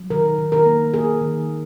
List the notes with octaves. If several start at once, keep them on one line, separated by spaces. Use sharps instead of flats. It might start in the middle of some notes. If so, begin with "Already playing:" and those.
Already playing: F#3
D#3 A#4
D#3
A#4
A#3
A#3 G#4
D#3
A#3